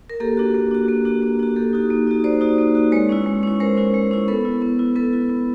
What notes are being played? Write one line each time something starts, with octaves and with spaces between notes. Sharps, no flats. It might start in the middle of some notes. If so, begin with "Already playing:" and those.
A#4
A#3 G4 A4
D4 F#4
A#3
D4 F#4
A#3
D4 F#4
A#3
D4 F#4
A#3 G4 A4
D#4 F#4
A#3
D#4 F#4
A#3 C5 D5
D#4 F#4
A#3
D#4 F#4
G#3 B4 C#5
C#4 E4
G#3
C#4 E4
G#3 A#4 C5
C#4 E4
G#3
C#4 E4
B3 A4 B4
E4
B3
E4
B3 A4 B4
E4
B3